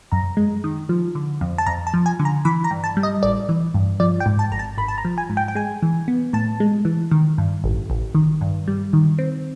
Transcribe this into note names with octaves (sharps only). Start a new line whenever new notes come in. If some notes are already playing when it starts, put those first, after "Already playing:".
F#2 A#5
G#3
D#3
F3
D3
F2
A5
F2 A#5
A5
F3
G#5
D3
A#5
E3 B5
A#5
G2
A5
G3
D#5
A1 D5
E3
G2
F3 D5
G5
G#2
A5
G#1 A#5
A5
G#1 B5
A5
A#5
F3
G#5
G#2
G5
G5
G#3 G#5
E3
B3
A2 A5
G#3
E3
D#3
G2
A1
A1
D#3
G2
G3
D#3
C4